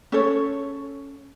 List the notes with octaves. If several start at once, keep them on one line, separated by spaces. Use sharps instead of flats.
C#4 A4 C#5